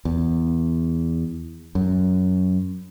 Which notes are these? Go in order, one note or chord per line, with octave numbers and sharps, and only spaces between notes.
E2
F#2